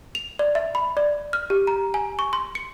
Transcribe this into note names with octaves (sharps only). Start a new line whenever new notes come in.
F7
D5
E5
B5
D5
F6
G4
A#5
G#5
C#6
C6
C#7